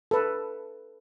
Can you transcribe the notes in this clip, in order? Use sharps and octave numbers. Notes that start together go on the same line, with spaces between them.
A4 B4